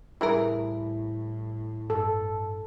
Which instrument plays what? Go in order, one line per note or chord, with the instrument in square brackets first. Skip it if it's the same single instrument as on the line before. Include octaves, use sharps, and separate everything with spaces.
[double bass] A2 [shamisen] E3 G#4 A#4 [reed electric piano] G3 E4
[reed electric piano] G2 [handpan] A4